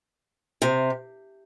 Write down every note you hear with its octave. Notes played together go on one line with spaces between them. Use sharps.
C3